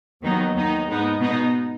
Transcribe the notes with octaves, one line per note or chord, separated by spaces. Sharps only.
D#2 D#3 F#3 B3 D#4
D#2 D#3 B3 D#4
G#2 G#3 B3 D#4
B2 B3 D#4